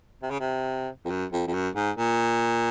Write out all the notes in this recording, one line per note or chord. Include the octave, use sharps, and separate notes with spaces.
C3
C#3
C3
F2
F#2
F2
F2
F#2
G#2
A#2